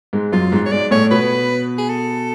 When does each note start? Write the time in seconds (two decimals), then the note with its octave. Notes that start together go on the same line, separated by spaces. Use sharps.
0.13 G#2 G#3
0.32 F#2 F#3 F4
0.52 G#2 G#3
0.66 C#5
0.71 G#2 G#3 D5
0.91 A2 A3 C#5
1.11 B2 B3 B4
1.78 G#4
1.89 A4